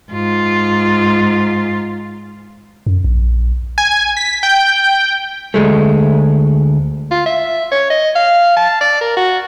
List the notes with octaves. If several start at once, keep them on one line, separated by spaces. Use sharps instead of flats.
G#2 F4
F#2
A#1
G#5
B6
G5
D2 G#3 A3
F4
E5
C#5
D#5
F5
A5
D5
A#4
F#4